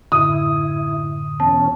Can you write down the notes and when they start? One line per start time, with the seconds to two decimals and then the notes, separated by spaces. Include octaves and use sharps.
0.12 F#2 A2 D3 E4 D#6
1.40 E2 B2 C#4 A5